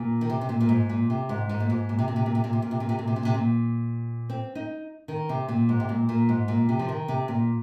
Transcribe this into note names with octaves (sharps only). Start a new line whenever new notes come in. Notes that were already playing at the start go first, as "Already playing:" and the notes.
Already playing: A#2
D#3
C3
C3
A#2
A#2
G#2
A#2
C3
G#2
G#2
A#2
G#2
A#2
C3
A#2
C3
A#2
C3
A#2
C3
A#2
C3
A#2
C3
A#2
C3
A#2
C3
A#2
C4
D#4
D#3
C3
A#2
G#2
C3
A#2
A#2
G#2
A#2
C3
F3
D#3
C3
A#2